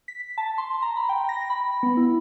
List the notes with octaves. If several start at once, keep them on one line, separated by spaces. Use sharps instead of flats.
B6
A5
C6
A#5
B5
G5
A#6
B5
B3
E4